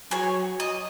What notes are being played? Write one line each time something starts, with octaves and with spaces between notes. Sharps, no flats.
F#3 G#4 C#5
D#5